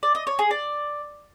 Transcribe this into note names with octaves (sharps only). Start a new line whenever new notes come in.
D5
D#5
C#5
G#4
D5